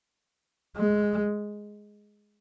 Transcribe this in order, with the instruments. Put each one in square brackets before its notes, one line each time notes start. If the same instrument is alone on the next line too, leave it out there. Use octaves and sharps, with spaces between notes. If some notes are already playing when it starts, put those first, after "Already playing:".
[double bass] G#3